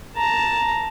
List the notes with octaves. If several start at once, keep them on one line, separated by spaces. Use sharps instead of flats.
A5 A#5